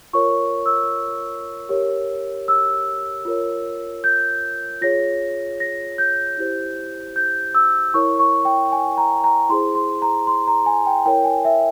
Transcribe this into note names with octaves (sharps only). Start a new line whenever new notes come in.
F4 A#4 C#5 C#6
E6
G4 A#4 C#5
E6
F4 A#4 C#5
G6
F4 G#4 C#5 A#6
A#6
G6
E4 G4 C5
G6
E6
E4 A#4 C#5 C#6
C#6
G5
G#5
A#5
A#5
E4 G#4 C5 C6
C6
A#5
C6
A#5
G#5
G5
E4 A#4 C#5 G5
G#5
E5